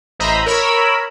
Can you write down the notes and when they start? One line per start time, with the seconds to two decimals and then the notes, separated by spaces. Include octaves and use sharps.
0.19 A1 C5 D#5 E5 A#5 B5
0.46 A#4 C#5 B5 E6